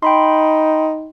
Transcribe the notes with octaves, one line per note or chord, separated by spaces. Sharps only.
D#4 G5 B5 C6